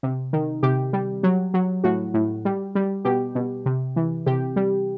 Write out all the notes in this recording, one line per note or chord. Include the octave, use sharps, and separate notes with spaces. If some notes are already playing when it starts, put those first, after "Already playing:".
C3
D#3
C3 G4
G3
F#3
F#3
A2 F#4
A2
G3
G3
B2 G4
B2
C3
E3
C3 G4
G3